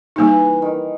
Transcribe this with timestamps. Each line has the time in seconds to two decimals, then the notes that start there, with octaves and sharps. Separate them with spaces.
0.16 E3 G3 A#3 D#4
0.62 D#3